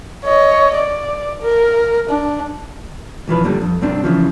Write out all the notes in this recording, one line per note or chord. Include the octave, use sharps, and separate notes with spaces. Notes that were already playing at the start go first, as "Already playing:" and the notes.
C#5 D#5
D5
A#4
D4
B1 E3 F3 B4
G2 A#2 D3 G3
F2
B1 G2 C4 D4
C#3 E3 F3